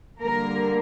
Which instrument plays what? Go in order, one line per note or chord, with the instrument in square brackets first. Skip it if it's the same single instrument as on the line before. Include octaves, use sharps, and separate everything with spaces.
[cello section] D3 G3 A#3 A#4